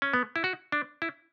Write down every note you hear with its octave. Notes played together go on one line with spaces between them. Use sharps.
C#4
B3
E4
F#4
D4
E4